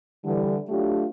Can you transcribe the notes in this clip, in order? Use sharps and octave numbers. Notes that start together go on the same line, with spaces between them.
D3 E3 G3
F#3 A3 D4 F4 G4